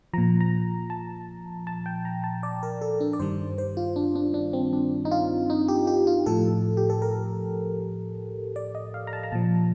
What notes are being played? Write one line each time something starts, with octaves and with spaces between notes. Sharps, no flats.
A#2 F3 A#5
A#5
A5
A5
G5
A#5
A5
D5
A#4
A4
D4
D5
G2 D#3 G3 C5
C5
F4
D4
D4
D4
C4
D4
D#4
F4
D#4
G4
G4
F4
A2 F3 A4
G4
A4
A#4
D5
D#5
F5
A#5
A5
A#5
A#2 F3 A5